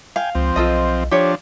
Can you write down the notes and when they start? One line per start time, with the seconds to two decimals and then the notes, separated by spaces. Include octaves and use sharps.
0.16 F5 G5 G#5
0.35 C#2 F3 C4
0.56 B1 F4 A4 D#5
1.11 F3 D4 G4 C#5